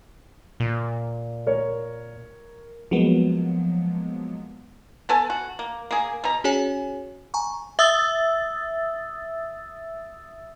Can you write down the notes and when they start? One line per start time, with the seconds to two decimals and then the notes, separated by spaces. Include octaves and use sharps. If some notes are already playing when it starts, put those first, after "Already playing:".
0.60 A#2
1.47 A#4 C#5
2.91 F3 F#3 G#3 A#3 B3
5.09 B3 A4 G#5 A5
5.30 F#4
5.59 A#3
5.91 A#3 G#4
6.24 B2 A#5
6.44 C#4 F#4 G#4 C#5 G#5
7.34 G#5 A#5 C#6
7.79 E5 D#6 E6 A6